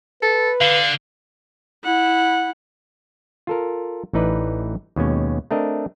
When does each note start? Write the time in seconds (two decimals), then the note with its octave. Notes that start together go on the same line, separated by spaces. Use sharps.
0.22 A4 B4
0.61 D3 F5
1.84 E4 F#5
3.47 F4 A4 A#4
4.13 A1 E3 D#4 B4 D5
4.96 D#2 B2 G#3 C#4
5.51 A3 C4 D4 A#4 D#5